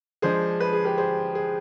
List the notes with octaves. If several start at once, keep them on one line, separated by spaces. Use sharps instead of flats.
F3 G#3 D4 G#4 C5
B4
G#4
G4 B4
G#4 C5
G#4